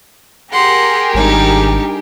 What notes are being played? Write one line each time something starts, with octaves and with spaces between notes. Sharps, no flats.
G4 G#4 A#4 F#5 A#5 C6
G#1 G3 D4 D#4